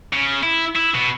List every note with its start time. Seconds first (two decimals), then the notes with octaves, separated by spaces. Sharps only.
0.13 C#3
0.43 E4
0.76 E4
0.95 B2